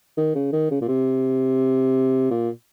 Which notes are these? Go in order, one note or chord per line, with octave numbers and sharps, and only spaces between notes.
D#3
C#3
D#3
C#3
A#2
C3
A#2